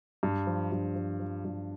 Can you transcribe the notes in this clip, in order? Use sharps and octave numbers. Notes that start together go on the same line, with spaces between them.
G2
F3
G2
F3
F3
G2